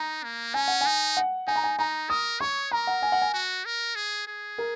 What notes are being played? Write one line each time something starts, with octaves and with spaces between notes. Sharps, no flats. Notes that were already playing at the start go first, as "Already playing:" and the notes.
Already playing: D#4 A#5
A#3
C#4 G#5
F#5
D#4 G#5
F#5
D#4 G#5
A#5
G#5
D#4 A#5
A#4 D#6
C#5 C#6
A#4 A#5
F#5
G#5
F#5
G#5
F#4
A#4
G#4
G#4
A#4